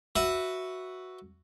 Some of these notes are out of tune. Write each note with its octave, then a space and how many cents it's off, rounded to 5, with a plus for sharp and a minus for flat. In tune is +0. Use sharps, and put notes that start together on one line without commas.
F#4 +0 B4 +0 E5 +0